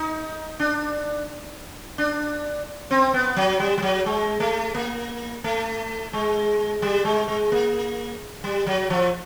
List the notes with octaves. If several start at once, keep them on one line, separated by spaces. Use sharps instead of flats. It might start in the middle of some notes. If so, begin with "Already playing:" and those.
Already playing: D#4
D4
D4
C4
B3
F#3
G3
G3
F#3
G#3
A3
A#3
A3
G#3
G3
G#3
G#3
A#3
G3
F#3
F3